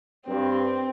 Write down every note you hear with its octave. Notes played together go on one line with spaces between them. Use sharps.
G2 C4